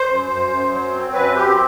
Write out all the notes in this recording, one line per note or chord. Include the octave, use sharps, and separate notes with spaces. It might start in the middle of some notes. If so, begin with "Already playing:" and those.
Already playing: C5
F#2
F#2
F#2
F#3
C4
F#2 B4
C4 G4